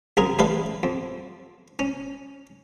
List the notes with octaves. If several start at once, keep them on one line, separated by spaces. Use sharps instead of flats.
C2 F#2 G#4 A#4
A1 G3 A3 B4 F5 C6
F2
C#4